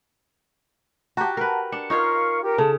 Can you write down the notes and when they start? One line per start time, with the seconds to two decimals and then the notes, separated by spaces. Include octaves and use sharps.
1.17 F#4 G4 F#5 A5 A#5
1.37 A#4 B4
1.72 D4 C#7
1.90 D#4 F4 A#4 C#5 F5 C#6
2.42 G4 A#4
2.58 C#3 A4 A5